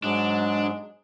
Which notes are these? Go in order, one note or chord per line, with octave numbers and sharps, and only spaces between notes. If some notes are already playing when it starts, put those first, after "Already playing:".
G#2 F#3 G#3 D4